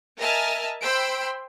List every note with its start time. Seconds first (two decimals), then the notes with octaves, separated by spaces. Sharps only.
0.19 A#4 D#5 E5 G#5 A5 F6
0.82 C5 G5 B5 C6 E6 D7